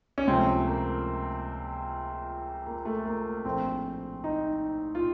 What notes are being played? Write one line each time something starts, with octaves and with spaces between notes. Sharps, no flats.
C#4
C#2 C3 F3 A3 C4
A#3
A#3
A3
A#3
A#1 A2 A3 C4
D#4
F4